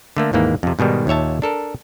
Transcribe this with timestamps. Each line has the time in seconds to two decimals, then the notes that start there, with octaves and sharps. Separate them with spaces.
0.17 D3 A3 A#3
0.33 D#2 G#2 E3 A#3
0.63 F2 C3
0.79 G#2 B2 D#3 G3
1.07 D#2 A#2 C#5 E5 A5
1.42 D4 A4 A#4